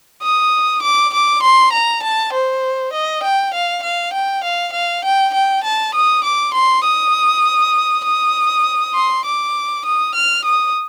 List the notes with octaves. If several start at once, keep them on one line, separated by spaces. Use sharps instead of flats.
D#6
D6
D6
C6
A#5
A5
C5
D#5
G5
F5
F5
G5
F5
F5
G5
G5
A5
D#6
D6
C6
D#6
D#6
C6
D6
D#6
F6
D#6